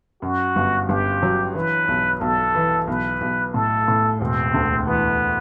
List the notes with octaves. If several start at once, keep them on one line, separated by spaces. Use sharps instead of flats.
F#2 F#4
G1
G1 G4
F#3
E3 B4
B1
B1 A4
E3
B1 B4
B1
A2 A4
A2
E1 C4
D2
E3 B3